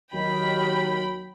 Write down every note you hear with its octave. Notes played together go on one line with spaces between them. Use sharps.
D#2 D#3 F#3 G5 B5